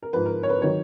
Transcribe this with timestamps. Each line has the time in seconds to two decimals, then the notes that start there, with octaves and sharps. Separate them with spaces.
0.03 A#4
0.13 G#2 F3 B4
0.26 A#4
0.43 C#5
0.50 B4
0.62 D#3 F#3 C#5